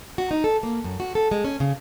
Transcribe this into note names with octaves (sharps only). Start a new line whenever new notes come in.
F#4
D#4
A4
A#3
F#2
F#4
A4
G#3
C#4
C#3